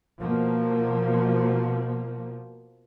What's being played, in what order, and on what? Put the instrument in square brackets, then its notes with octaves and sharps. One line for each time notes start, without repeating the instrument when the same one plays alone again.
[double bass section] B2 F3 A#3